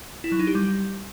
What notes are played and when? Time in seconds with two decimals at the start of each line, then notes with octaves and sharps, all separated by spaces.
0.24 E4
0.32 F#3
0.39 D#4
0.47 G4
0.55 G3